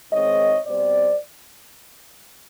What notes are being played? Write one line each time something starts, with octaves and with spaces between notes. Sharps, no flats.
G#2 D#3 G#3 C4 C#5 D#5
B2 G3 C4 C5 D5